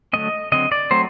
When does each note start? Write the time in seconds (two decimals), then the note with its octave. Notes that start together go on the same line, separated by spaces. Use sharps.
0.13 D3 F#3 A3 C4 D#5
0.52 D3 F#3 C4 D#5
0.72 D5
0.91 F#3 A3 C4 C5